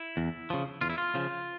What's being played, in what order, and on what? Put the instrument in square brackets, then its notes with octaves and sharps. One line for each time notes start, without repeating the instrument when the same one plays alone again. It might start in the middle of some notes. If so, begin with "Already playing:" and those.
Already playing: [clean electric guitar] E4
E2
C#3 F3
E2 F4
E4
F4
C#3 F3